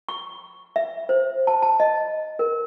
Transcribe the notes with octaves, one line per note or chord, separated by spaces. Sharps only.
C#6
E5
C5
A5
A5
D#5
A#4